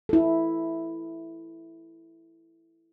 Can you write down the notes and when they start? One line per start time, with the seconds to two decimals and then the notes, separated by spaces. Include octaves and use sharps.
0.09 E4 A4